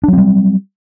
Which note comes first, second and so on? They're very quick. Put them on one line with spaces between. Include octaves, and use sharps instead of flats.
D4 F#3 C4 G3